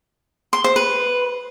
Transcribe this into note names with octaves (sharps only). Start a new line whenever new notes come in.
C6
C5
B4